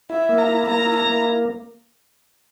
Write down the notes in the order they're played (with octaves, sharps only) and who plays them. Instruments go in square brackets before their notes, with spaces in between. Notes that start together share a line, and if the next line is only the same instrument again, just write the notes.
[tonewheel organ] E4 [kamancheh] E5
[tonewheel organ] A#3
[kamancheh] A#5
[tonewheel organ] E4
[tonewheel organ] A#3 [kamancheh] A#5
[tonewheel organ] E4
[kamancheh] A#5
[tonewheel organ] A#3